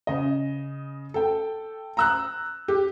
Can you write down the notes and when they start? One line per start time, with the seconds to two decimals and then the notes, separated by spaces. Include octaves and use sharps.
0.07 C#3 D#5
1.14 A4 G5
1.97 A#5 E6 F#6
2.68 G4